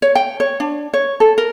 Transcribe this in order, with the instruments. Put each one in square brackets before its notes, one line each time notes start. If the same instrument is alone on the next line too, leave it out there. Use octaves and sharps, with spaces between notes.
[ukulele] C#5
G5
C#5
D4
C#5
A4
A#4